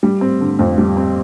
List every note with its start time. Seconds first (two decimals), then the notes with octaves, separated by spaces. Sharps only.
0.03 G3
0.21 C4
0.41 D3
0.59 F2
0.78 G3
0.97 C4